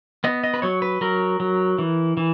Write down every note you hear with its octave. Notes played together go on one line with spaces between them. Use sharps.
B3 D#5
D#5
B4
F#3 C#5
B4
F#3 A#4
F#3
E3
E3